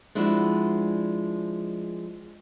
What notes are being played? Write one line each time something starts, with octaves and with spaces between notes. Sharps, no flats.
F3 G#3 D4 E4 F#4